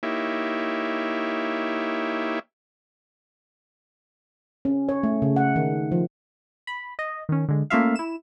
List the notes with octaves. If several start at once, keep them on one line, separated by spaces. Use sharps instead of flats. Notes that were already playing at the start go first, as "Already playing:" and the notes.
A#3 D#4 E4 G4 C#5 E5
C#4
C#5
A3
C#3
F#5
D#3
F3
B5
D#5
D#3 C#4
D3 G#3
A3 A#3 C#4 F4 E5 F5
E4 E7